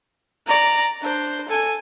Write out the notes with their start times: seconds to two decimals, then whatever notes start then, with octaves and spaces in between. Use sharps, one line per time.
0.47 D5 A#5
1.02 D4 C5
1.49 A4 G#5